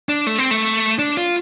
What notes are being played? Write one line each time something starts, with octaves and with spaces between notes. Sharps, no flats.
D4
A3
C4
A3
D4
F4